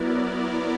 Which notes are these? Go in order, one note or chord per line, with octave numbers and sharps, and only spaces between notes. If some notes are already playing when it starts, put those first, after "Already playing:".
Already playing: F#3 B3 E4 A#4 D5